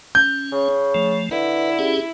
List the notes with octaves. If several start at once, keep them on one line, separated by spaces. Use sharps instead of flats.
C#4 G6
C#3
F3 A3
D3 E4 B4
C#4 G4 G#4